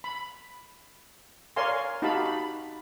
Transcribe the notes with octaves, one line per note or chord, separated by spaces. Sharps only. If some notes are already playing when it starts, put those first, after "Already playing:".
B5
A#4 C#5 D5 F5 G#5 C6
D#4 F#4 G4 F5 A5 B5
B5